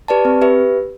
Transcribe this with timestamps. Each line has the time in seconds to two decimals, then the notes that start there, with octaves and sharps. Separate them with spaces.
0.08 G4 B4 D5 A5
0.25 C4
0.42 G4 B4 E5